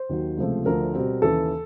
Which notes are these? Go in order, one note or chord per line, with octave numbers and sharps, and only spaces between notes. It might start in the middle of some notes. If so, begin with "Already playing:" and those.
Already playing: C5
D#2 D#3 F#3
C#2 C3 F3 A3
D2 D3 F3 A3 A#4
B2 G3 C4
D#2 C#3 E3 A4